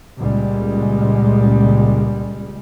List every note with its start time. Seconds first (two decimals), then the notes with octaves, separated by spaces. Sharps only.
0.18 C#2 A#2 G3 G#3